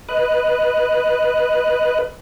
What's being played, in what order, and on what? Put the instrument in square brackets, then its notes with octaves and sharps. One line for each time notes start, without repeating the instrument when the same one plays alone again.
[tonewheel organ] B4 D#5 F#6